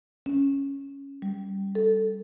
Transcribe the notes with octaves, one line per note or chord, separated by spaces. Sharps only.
C#4
G3
A4